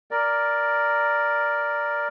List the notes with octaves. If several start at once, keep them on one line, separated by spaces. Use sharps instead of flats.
A#4 D5